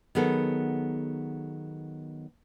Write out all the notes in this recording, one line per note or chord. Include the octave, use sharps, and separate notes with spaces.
D#3 F#3 B3 G#4 A4